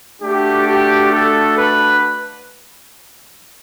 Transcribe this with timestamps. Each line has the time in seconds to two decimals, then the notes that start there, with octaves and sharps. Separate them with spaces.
0.21 A3 D4 F#4 G4
0.67 G4
1.12 A4
1.58 B4